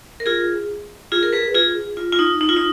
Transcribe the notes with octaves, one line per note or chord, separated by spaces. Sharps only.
A#4
F4 G#4
F4 G#4
A#4
G#4 B4
F4 G#4
F4
F4
D#4
D#4
F4
D#4